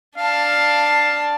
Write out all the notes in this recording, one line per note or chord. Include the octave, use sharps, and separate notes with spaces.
D4 F5 A5